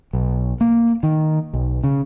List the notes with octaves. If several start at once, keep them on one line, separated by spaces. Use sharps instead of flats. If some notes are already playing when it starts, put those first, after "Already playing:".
B1
A#3
D#3
B1
C#3